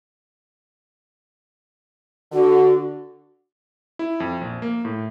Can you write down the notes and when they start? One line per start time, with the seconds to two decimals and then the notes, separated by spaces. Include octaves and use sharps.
2.32 D3 F#4
3.99 E4
4.20 F2
4.41 A#1
4.62 A#3
4.85 A2